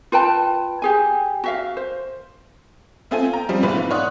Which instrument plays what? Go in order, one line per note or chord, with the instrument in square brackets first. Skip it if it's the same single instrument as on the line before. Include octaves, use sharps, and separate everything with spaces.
[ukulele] F4 B4 G5 A5
G4 G#4 G#5
F#4 E5 F5
C5
[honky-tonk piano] A3 B3 C4 F4 A4 G#5
G5 A#5
F3 G3 C4 C#4
B1 G#2 E3 B3 B4 B5
E3 F4
C#5 D5 F#5 C6 D#6 F#6